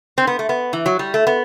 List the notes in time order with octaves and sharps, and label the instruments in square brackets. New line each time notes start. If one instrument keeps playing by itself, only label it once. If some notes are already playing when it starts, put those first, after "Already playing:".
[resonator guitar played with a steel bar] C4
B3
A3
B3
E3
F#3
G3
A3
B3